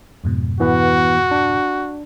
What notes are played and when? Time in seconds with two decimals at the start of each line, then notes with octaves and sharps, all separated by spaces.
0.24 F2 G#2 B2
0.60 E3 B3 F#4 B4
1.31 D4